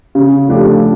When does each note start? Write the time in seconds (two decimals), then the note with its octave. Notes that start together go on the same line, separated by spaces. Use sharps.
0.15 C#3
0.49 F3 A3 D4 G4